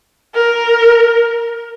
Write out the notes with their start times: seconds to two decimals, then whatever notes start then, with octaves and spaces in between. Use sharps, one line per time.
0.35 A#4